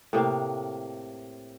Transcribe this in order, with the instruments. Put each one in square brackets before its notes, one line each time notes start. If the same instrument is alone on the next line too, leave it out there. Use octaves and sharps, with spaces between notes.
[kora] A2 C3 A#3 F5